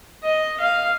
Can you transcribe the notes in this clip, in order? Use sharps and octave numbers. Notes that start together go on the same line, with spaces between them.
D#5
F5